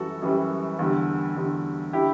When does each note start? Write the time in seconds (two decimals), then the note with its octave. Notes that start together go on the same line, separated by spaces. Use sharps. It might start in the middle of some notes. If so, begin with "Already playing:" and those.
Already playing: F#2 E3 G3 F#4 A4
0.22 F#2 E3 G3
0.79 E2 D3 G3
1.36 E2 D3 G3
1.93 D3 G3 E4 G4